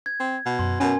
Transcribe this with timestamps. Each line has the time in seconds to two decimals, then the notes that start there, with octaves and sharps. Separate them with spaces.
0.06 G#6
0.20 C4
0.46 B2
0.59 F#2 C6
0.80 B2 C#4 A#4 G#5